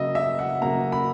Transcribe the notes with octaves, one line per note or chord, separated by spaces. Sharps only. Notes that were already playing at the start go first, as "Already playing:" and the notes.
Already playing: C#3 F#3 A#3 D#5 E5
E5
F#5
C#3 F#3 A#3 A#5
B5